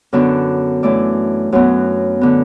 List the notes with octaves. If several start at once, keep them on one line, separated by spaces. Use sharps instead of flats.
F#2 D3 B3 D4 F#4
F#2 E3 A3 E4 D5
F#2 F#3 B3
D3 B3